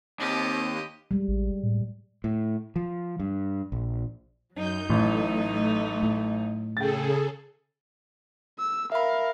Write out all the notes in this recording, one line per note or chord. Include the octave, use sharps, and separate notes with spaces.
D#2 C4 G4 D#5
G3 G#3
A1
A2
A2
F3
G2
A#1
F#2 F#3 D#4 G6
A1 A2 A3
A2
C#3 G#4 A4 G5 A6
E6
A#4 E5 F5 B5